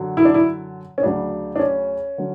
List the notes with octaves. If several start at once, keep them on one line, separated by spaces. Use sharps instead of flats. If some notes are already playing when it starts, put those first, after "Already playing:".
Already playing: F#2 D3 F#3
E4
D4
E4
C#4
D2 C#3 F#3 D4
D4
C#4
D3 F#3